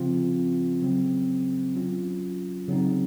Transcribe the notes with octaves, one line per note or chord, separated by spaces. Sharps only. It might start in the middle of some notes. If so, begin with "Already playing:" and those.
Already playing: C#3 F3 C4 F4
C#3 F#3 C4
F#3 C#4 F4
C#3 F#3 C4 D#4